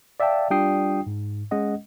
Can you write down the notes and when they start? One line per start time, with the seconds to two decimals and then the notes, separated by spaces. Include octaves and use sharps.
0.20 D5 E5 F5 G5 A5
0.50 G3 D4 F4 G5 D#6 C7
1.07 G#2
1.51 G#3 C#4 D#5 F#5